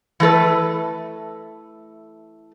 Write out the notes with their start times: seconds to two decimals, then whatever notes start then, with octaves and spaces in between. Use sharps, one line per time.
0.20 E3 A3 A4 B4